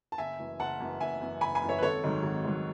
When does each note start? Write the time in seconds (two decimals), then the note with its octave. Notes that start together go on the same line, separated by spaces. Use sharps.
0.12 A5
0.18 F#1 E5 G#5
0.39 F#2 E3
0.60 F#1 F#5 A5
0.80 F#2 E3
1.00 F#1 E5 G#5
1.21 F#2 E3
1.41 F#1 G#5 B5
1.55 G#5 B5
1.62 F#2 E3
1.69 C#5 E5
1.78 B4
1.82 G#1 A4 C#5
2.03 G#2 D#3 F#3
2.23 G#1
2.44 G#2 D#3 F#3